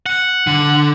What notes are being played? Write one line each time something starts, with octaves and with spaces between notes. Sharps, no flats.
F#5
D3